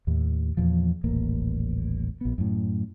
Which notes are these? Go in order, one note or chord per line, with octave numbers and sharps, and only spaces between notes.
D#2 A2
E2 A#2 F3
D#1 A1 A#3
A#1 B3
F#2 A2